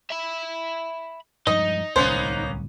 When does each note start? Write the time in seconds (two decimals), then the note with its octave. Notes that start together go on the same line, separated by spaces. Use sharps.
0.10 E5 B5
1.47 G2 F3 G#3 D#4 D#5
1.96 D1 C2 A#3 B3 C#4 C5